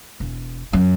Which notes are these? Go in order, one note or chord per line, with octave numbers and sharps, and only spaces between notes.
E1
F#2